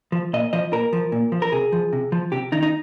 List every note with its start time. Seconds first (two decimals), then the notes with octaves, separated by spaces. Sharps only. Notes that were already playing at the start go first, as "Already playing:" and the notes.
0.12 F3
0.33 A#2 D#5
0.53 F3 D#5
0.72 A#2 A#4
0.93 F3
1.12 A#2
1.32 F3
1.42 A#4
1.52 C3 G#4
1.72 F3
1.93 C3
2.12 F3
2.32 C3 G4
2.52 D#3 D#4
2.63 D#4